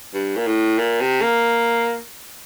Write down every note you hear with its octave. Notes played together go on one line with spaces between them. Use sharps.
G2
A#2
A2
A#2
C3
A#3